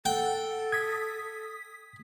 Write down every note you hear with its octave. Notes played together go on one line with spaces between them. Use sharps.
A4 F#5 G5
D#6 G#6 B6